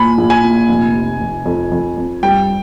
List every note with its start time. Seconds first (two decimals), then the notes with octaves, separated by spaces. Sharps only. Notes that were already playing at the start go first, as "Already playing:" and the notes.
Already playing: A#2 G#5 B5
0.18 A#1
0.30 G#5
0.43 A#2
0.69 F1
0.95 C3
1.20 F1
1.46 F2
1.72 F2
1.97 F2
2.23 G2 G5